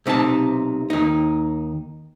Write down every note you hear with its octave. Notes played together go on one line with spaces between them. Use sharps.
B1 C3 D#4 G4 A5
D#2 D#4